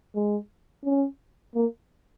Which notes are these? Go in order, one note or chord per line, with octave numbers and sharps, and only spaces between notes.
G#3
C#4
A#3